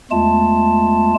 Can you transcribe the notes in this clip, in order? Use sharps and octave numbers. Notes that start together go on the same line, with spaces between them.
E2 G#3 A3 F4 A5